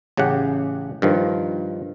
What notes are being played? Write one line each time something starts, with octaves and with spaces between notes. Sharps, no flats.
A1 C#3 G4 F#5
G2 D#3 F3